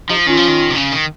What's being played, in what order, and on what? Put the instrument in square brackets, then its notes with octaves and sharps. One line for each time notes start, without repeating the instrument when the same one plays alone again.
[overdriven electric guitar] F3 [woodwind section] D#4 G4
[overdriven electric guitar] D#3 [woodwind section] C#4 F4
[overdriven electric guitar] F3
D#3
C3
C#3
D#3